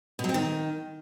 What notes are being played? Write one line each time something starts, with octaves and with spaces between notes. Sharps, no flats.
B2
F#3
C4
D#3